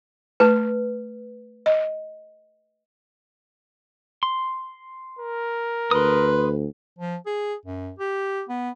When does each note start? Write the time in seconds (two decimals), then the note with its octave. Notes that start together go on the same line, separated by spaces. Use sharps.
0.40 A3 B4 A5
1.66 D#5
4.23 C6
5.19 A#4
5.91 D2 B4 C6 D#6
6.99 F3
7.26 G#4
7.66 F#2
7.99 G4
8.49 B3